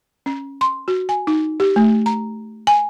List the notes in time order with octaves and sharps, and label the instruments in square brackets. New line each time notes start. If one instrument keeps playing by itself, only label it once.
[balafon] C#4
C6
F#4
G#5
D#4
G4
A3
A#5
G#5